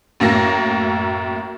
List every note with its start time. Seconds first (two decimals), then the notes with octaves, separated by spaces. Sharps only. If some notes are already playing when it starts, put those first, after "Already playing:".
0.20 F#2 A2 A#3 A#6